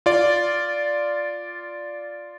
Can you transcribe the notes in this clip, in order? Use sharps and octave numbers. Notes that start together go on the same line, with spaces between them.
F4 D5